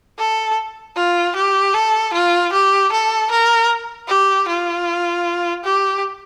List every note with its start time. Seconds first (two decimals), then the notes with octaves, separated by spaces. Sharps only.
0.18 A4
0.96 F4
1.36 G4
1.75 A4
2.14 F4
2.53 G4
2.92 A4
3.31 A#4
4.09 G4
4.48 F4
5.65 G4